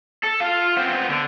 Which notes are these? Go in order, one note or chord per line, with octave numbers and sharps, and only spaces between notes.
A4
F4 F5
B3 C4
D3